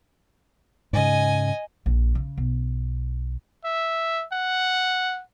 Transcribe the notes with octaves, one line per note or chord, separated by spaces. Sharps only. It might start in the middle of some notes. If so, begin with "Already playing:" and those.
G#2 C#3 D#5 G#5
A#1
C#3
B1
E5
F#5